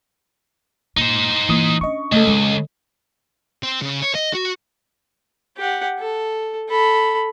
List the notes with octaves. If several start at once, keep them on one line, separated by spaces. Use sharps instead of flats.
A#2 D#4 C5
E3 A#3 D#6
C#4 D4 D#5 C#6
C#2 A3 A4 D#5
G#3
C4
C#3
C#5
D#5
F#4
G4 F#5
A4
A4 B5